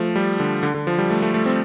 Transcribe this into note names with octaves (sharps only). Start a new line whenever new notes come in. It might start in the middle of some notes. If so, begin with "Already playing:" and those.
Already playing: F3 A3
G3
D3
D3
D3
F3
G3
A3
A3
A3
C4